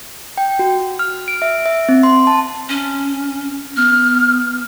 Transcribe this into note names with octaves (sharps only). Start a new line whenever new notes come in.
G5
F#4
F6
D7
E5
E5
C4
C6
A5
C#4
B3 F6